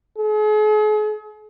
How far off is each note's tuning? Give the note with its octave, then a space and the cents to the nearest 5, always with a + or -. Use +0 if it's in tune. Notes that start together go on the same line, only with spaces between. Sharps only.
G#4 +40